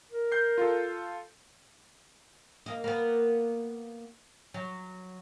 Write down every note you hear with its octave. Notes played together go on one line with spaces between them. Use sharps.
A#4
G6 C7
F4 A4
A#3 D#5
A#3 B3
F#3